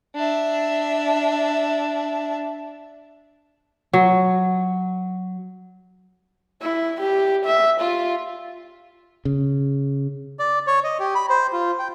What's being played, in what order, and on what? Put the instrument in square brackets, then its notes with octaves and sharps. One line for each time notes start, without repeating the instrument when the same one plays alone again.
[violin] D4 E5
[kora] F#3
[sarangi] E4
G4
E5
F4
[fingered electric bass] C#3
[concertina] D5
C#5
D#5
G4
B5
C5
F4
G5